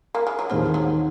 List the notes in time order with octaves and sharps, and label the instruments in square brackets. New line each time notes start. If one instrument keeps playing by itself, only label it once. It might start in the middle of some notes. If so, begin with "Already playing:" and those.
[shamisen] A#3
G#3
F#3
[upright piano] D#2 D#3 G#3 C4 [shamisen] F3
[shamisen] F#3